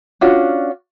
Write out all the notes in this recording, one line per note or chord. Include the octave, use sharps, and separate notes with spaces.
C#4 D4 F4 F#4